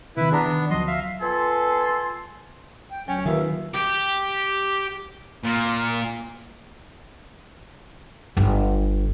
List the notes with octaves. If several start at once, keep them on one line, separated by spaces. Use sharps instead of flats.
C3 D#3 E4 B4
B3 D4 G#4 A#5
D#3
D2 F3 F#3 D#5 C6
E5 F5
B3 F4 A4 G#5 C6
G5
D2 F#3 C#4 G5 G#5
D#2 D#3 F4 A#4 B4 E5 F5
G4
A#2
G1